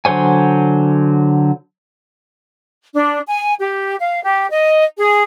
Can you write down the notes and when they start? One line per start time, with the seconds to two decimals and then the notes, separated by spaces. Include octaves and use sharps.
0.05 D3 F#3 C5 C#5 G#5
2.95 D4
3.27 G#5
3.59 G4
3.99 F5
4.24 G4
4.50 D#5
4.98 G#4